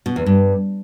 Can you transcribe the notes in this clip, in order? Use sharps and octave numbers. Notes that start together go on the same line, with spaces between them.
B2
E2
G2